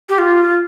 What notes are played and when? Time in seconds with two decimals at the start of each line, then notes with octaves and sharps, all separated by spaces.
0.09 G4
0.18 F4